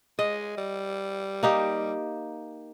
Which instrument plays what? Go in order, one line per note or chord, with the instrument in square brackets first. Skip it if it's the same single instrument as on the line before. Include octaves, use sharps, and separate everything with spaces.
[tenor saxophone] G#3 [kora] D#5
[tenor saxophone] G3
[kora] A#3 D#4 G4